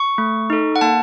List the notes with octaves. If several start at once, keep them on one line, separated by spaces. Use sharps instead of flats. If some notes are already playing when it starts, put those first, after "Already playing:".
Already playing: C#6
A3
D#4 A4
F#5
A#3 A5